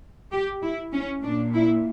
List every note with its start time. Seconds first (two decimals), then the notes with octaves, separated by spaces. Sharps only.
0.32 G4
0.62 E4
0.93 C#4
1.24 A#2 D4
1.55 E4